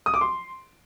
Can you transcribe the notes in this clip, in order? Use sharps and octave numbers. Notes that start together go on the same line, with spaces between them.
D#6
D6
C6